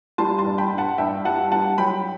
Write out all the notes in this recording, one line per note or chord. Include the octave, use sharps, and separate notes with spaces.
G3 A5 C6
A5 C6
G2
G5 B5
G2
F#5 A5
G2 E5 G5
G3 F#5 A5
G3 F#5 A5
F#3 G5 B5